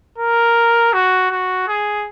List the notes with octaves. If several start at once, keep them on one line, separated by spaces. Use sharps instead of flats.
A#4
F#4
F#4
G#4